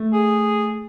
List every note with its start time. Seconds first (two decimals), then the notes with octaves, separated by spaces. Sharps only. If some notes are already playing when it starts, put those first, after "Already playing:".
Already playing: A3
0.13 G#4